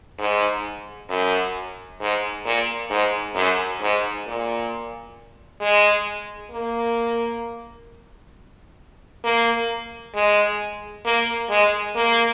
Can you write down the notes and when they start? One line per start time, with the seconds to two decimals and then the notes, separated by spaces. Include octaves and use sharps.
0.19 G#2
1.10 F#2
2.00 G#2
2.45 A#2
2.90 G#2
3.35 F#2
3.81 G#2
4.27 A#2
5.61 G#3
6.52 A#3
9.24 A#3
10.15 G#3
11.05 A#3
11.49 G#3
11.96 A#3